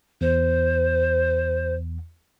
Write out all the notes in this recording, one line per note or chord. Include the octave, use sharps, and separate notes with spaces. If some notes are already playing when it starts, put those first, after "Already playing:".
E2 C5